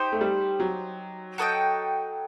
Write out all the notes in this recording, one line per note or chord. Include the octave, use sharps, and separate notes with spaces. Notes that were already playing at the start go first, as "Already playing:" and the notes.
Already playing: D#4 G4 C5
A3
G3
F#3
F#4 A4 D#5 G5